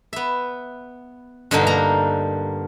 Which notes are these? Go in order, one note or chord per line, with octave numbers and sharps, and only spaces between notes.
B3 E5
G2 B2 D3 A#3 D#4
A#3 A#5